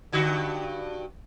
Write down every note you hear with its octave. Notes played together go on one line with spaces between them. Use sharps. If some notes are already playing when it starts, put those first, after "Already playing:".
G2 D3 F#4